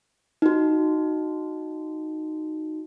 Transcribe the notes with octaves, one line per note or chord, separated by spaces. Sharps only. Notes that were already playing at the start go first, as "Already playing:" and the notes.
D#4 F#4